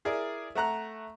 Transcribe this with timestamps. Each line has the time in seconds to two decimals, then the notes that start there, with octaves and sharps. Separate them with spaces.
0.05 E4 G#4 A#4 D5
0.55 A3 F#5 A#5 F#6